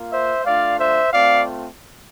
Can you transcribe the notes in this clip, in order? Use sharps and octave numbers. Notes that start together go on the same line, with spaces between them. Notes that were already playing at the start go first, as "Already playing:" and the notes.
Already playing: A#3 F4
C5 E5
A3 D4 F4 D5 F5
C5 E5
A3 C4 F4 D5 F5